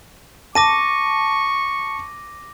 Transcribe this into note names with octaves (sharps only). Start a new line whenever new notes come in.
A5 C#6 D6 A#6 D#7